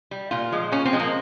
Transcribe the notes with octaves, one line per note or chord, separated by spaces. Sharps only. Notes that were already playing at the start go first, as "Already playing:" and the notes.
G3
A#2 F4
F3 G#3
A#2 C#4
C4
F3 G#3
A#3